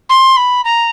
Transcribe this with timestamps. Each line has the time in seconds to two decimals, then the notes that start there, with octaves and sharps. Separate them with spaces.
0.09 C6
0.36 B5
0.64 A#5